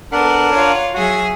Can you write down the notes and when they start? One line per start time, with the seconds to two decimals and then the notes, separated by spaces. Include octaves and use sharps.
0.12 B3 D4 A4 A#4 F#5
0.52 F4 C#5
0.94 F#3 F#4 G#4 E5